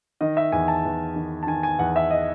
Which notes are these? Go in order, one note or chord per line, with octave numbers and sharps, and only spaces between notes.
D#3 D#5
E5
E2 G#5
A5
E2
D#3
A5
D#3 G#5
G#5
E2 F#5
E5
D#5